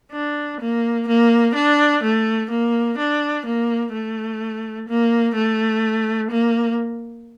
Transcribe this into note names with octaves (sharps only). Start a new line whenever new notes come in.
D4
A#3
A#3
D4
A3
A#3
D4
A#3
A3
A#3
A3
A#3